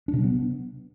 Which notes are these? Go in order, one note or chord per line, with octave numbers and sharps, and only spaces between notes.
D4
C3
F#3
B3